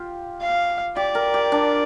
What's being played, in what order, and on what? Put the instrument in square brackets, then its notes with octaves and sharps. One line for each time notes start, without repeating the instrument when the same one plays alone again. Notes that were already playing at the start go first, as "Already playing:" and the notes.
Already playing: [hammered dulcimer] F4 G4
[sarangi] F5
[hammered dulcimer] G4 [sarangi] D5
[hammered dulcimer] A#4
G4
D4